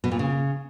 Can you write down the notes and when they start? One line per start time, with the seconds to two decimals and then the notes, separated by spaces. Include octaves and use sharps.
0.04 B2
0.11 A#2
0.19 C#3